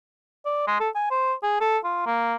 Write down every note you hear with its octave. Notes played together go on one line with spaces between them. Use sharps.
D5
G#3
A4
G#5
C5
G#4
A4
F4
A#3